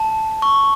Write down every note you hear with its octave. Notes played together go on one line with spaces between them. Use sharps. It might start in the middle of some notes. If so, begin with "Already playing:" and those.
Already playing: A5
C#6